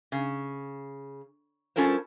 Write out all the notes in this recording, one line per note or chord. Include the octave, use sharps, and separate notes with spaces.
C#3
G3 C#4 F4 A4 A#4 C5